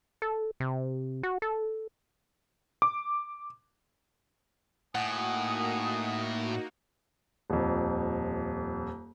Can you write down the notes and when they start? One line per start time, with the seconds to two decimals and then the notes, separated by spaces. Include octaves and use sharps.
0.22 A4
0.60 C3
1.23 F#4
1.42 A4
2.82 D6
4.95 A2 A#3 D#4 F#4 F#5 G#5 D#6
7.50 D#1 F2